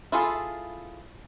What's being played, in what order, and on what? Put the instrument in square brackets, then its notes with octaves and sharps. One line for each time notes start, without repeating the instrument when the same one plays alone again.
[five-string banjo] E4 F4 G#4 A4